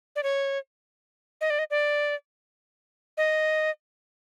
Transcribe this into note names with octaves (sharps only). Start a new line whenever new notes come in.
D5
C#5
D#5
D5
D#5
D5
D#5